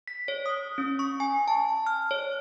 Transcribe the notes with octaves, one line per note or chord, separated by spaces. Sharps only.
B6
C#5
D#6
C#4
C#6
G#5
A5
F6
C#5